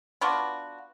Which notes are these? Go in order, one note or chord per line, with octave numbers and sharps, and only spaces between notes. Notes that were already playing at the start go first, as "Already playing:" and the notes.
B3 D4 F4 F#4